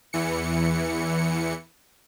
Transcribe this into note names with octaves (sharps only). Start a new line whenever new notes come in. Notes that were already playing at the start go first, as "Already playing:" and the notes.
E2 E3 C#7